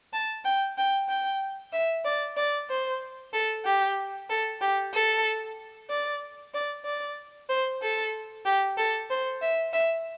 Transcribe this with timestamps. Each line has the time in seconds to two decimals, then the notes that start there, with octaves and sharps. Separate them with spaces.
0.13 A5
0.45 G5
0.78 G5
1.09 G5
1.73 E5
2.05 D5
2.37 D5
2.70 C5
3.33 A4
3.65 G4
4.30 A4
4.61 G4
4.93 A4
5.90 D5
6.54 D5
6.85 D5
7.49 C5
7.82 A4
8.45 G4
8.78 A4
9.10 C5
9.42 E5
9.73 E5